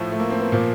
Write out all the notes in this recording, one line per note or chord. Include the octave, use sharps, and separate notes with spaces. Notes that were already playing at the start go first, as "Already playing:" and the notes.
Already playing: A2 F3 A3
A3
A#3
C4
B3
A#2 F3 A#3